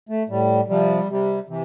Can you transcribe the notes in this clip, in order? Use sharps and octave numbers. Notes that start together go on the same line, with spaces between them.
A3
A2 G3
C3 F3 G3
C3 G3
C3 E3